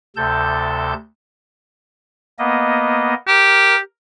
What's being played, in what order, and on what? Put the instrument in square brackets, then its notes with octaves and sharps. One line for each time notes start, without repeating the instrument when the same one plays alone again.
[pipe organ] D2 C3 A4 A5 G6
A#3 B3 D#5
[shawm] G4 [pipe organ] A#4